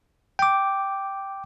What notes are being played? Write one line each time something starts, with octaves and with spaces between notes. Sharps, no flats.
G5 D6